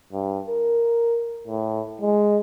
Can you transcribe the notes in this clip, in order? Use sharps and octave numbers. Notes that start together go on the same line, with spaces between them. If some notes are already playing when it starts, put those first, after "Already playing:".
G2
A#4
A2
G#3